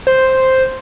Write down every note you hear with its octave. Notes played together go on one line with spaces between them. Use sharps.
C5